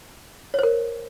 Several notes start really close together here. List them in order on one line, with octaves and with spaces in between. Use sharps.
C#5 C5 A#4